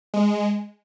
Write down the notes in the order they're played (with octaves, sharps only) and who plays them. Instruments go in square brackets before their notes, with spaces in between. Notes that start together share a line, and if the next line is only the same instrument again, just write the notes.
[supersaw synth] G#3